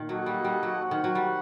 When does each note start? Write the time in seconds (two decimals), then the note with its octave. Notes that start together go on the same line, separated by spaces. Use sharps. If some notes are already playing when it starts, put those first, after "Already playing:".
Already playing: A#2 D#3
0.09 F#3 A#3 F#4 A4 D#5 F#5
0.26 G3
0.44 G3
0.63 F#3
0.80 F#4 C5 F#5
0.91 D#3
1.04 F#3
1.15 G3